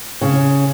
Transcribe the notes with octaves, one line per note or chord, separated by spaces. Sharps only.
C#3